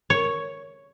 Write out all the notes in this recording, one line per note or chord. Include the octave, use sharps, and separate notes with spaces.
C#5